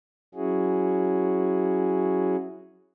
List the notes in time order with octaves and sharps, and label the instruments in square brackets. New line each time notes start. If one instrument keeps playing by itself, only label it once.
[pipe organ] F#3 C#4 E4 F#4 G#4